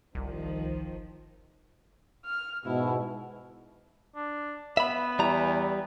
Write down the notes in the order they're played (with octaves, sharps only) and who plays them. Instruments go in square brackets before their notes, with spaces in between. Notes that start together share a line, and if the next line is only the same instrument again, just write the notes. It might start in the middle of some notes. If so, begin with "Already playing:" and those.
[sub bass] G1 [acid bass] C2 [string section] D#3 F3
[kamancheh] F6
[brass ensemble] G#2 B2 [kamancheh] E4
[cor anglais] D4
[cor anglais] B3 [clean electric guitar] E5 B5
[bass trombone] E2 [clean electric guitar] G3 A#5